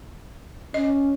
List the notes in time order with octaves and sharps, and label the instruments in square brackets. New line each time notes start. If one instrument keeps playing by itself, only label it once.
[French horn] C#4 [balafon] D#5